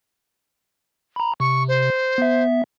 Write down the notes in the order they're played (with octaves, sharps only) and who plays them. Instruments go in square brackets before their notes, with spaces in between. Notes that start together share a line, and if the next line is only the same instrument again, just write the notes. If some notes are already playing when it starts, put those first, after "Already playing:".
[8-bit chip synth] A#5 B5
[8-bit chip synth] C3 [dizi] C#6
[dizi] C5
[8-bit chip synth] B3 E5